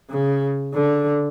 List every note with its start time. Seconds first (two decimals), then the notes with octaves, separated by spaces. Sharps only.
0.11 C#3
0.75 D3